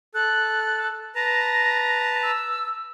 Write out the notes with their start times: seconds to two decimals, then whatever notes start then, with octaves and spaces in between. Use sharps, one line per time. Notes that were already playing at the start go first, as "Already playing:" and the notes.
0.15 A4 F#6
1.15 B4 A5 A#5 A#6
2.23 E6